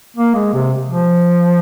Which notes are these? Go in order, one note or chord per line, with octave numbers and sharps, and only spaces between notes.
A#3
G#3
C3
F3